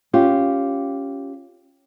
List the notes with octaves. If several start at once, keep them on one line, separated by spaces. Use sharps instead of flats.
C#4 F4 G4